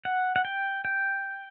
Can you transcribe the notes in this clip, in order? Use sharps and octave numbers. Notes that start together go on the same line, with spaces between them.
F#5
F#5
G5
G5